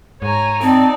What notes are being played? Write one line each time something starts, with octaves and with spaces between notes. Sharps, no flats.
G#2 C#5 G#5 A#5
C4 D#4 D5 A5